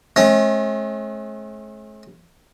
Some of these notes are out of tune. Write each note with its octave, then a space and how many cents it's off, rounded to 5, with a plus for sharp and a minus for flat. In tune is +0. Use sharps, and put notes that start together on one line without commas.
A3 -45 C#4 -40